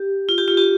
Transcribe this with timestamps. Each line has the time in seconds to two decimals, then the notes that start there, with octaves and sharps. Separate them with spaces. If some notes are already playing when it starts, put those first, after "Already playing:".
Already playing: G4
0.29 F4
0.38 G4
0.48 F4
0.57 G4